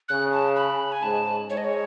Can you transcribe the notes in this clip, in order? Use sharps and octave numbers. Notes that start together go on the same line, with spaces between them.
C#3 F#6
A5
B5
G#5
G#2 A5
G#2 C#5
D#5
C#5